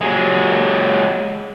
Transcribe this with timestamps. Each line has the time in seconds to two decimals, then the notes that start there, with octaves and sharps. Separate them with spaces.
0.01 F#3 G#3